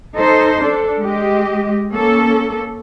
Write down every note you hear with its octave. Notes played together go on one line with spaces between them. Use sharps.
D#4 A4 C5
D4 A4
G#3 G4 D#5
A#3 C#4 A4